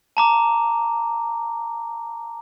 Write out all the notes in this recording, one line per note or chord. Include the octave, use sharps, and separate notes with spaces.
A5 A#5 D6